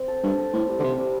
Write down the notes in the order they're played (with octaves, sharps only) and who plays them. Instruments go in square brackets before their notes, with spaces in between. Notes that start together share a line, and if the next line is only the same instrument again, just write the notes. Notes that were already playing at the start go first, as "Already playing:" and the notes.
Already playing: [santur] C4
A4
[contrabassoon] G2 [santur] A4
[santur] A4
[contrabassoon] A2 [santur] C4
[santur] G3
[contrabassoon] D3
[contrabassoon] C3 [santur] G3
[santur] G3